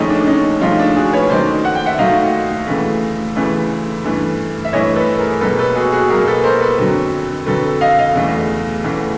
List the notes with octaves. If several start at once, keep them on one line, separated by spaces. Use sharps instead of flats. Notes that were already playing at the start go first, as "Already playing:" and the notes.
Already playing: D#2 C#3 F3 A3 C#4 D#4
D4
D4
C#4 D#4
D#2 C#3 F3 A3 D#4 F4
D4
F#4 G#4
B4 C#5
D#2 D#3 F#3 A3 C5 D5
F#5
G5
E5 F#5
D#2 D#3 F#3 A3 D#5 F5
D2 C#3 E3 A3
D2 C#3 E3 A3
G2 E3 A3
E5
G2 E3 A3 C#5 D#5
A4 B4
G#4 A#4
C#2 B2 F#3 A#3 A4 B4
A4 B4
F#4 G#4
F#4 G#4
C#2 B2 F#3 A#3 G#4 A#4
A4 B4
A#4 C5
A4 B4
F2 D3 F#3
F2 D3 F#3 A4 B4
D#5 F5
D#5 F5
E2 C#3 E3 A3
E2 C#3 E3 A3